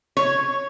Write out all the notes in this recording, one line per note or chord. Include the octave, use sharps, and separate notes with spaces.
C#5